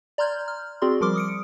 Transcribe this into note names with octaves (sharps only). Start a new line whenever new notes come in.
D5 A#5 C6 F6 G6 G#6
F6
C4 F#4 G#4 D5 C6
F3 G3 A#4 C6 D6 F6
D#6 C#7 D7